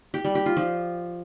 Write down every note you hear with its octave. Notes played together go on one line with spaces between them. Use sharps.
G4
G3
G4
F4
F3